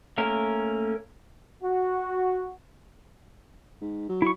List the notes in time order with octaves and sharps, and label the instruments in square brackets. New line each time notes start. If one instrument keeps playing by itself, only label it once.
[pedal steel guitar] A3 A#3 C#4 A#4
[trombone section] F#4
[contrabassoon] G#2
F#3
[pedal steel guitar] E4 C#6